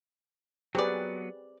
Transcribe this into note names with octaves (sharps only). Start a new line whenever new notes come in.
F#3 B3 C4 G4 G#4 B4 D5